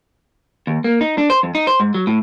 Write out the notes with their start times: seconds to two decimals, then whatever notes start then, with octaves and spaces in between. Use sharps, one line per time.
0.67 D#2
0.84 A#3
1.01 D#4
1.18 D4
1.30 C5
1.43 F2
1.55 D#4
1.67 C5
1.80 G#2
1.95 F#3
2.07 A2